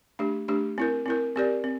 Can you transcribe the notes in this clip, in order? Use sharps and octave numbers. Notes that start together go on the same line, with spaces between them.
A3 D4 G4
A3 D4 G4
C4 E4 A#4
C4 E4 A#4
C4 G4 A#4 D5
C4